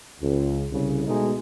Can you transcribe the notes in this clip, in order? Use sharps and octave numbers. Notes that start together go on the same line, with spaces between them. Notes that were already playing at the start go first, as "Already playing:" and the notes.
C#2
C2 C#3
B2 G#3 A3 D#4